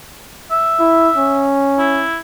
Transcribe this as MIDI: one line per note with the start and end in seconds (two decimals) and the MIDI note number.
0.51 1.48 76
0.80 1.10 64
1.17 2.07 61
1.78 2.18 64